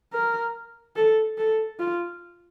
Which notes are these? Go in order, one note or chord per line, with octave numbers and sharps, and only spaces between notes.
A#4
A4
A4
F4